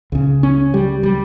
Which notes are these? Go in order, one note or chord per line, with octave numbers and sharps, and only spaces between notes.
C#2 C#3
C#4
G3
G3